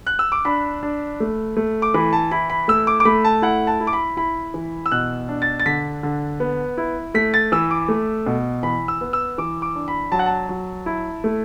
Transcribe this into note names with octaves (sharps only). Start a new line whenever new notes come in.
F#6
E6
D6
D4 B5
D4
A3
A3
D6
E3 B5
A5
E4 B5
B5
A3 E6
D6
D6
A3 B5
A5
E4 F#5
A5
E4
D6
B5
E4 B5
E3
E6
B2 F#6
D4
A6
A6
D3 B6
D3
B3
E4
A3 B6
A6
E3 E6
D6
A3
B2
E3 B5
E6
B3
E6
E3 D6
D6
D4
B5
F#3 A5
F#5
A5
F#3
E4
A3